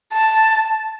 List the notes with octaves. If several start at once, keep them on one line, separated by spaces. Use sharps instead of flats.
A5